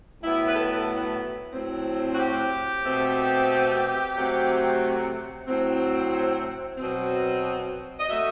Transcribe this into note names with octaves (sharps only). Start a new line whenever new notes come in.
A2 F#3 B3 E4
B4
A4
A2 F#3 C4
F#4
G4
B2 A3 C4
C3 F#3 A3 C4
A2 F#3 C4
B2 F#3 C4
D#5
F#3 A3 E5